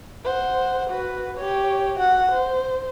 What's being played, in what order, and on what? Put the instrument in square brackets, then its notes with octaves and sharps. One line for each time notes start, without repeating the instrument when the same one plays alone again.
[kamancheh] C5 F#5
F#4 B4
G4 C#5
F#4 F#5
C5